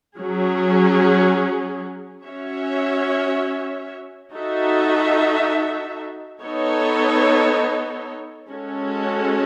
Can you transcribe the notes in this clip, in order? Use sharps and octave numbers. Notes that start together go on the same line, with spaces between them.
F#3 C#4 G#4
C#4 F#4 C#5 E5
D#4 F#4 A4 E5
B3 D#4 A4 C#5
G#3 C#4 F#4 A4